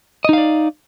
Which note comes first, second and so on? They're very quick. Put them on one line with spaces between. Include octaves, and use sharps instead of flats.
D#5 D#4 F5 D5